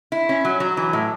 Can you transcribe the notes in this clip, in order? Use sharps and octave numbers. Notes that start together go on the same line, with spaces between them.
E4
C#4
F#3
F#3
E3
A2